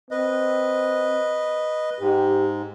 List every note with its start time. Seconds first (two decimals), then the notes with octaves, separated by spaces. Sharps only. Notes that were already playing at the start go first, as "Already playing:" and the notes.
0.11 C4 B4 D#5
2.00 G#2 G4